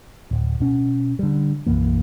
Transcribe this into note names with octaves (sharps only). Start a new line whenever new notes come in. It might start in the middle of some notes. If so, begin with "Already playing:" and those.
D1
B2 C#4
D3 G3
B1 F#2 E3 A#3